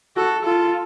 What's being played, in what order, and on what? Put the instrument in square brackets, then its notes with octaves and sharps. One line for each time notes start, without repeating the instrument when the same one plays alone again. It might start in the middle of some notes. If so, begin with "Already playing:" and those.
[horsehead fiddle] F#4 [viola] A4
[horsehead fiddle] F4 [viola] A4